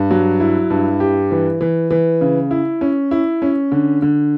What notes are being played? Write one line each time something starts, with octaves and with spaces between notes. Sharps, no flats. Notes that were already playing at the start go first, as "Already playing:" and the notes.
Already playing: G2
F#3
E4
G2
G4
E3
E3
E3
C#3
E4
C#4
E4
C#4
D3
D3